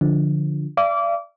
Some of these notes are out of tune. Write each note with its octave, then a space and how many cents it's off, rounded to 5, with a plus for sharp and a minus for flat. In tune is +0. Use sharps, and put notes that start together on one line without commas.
D3 +0 F3 +0
D5 +0 F5 -45 D6 -25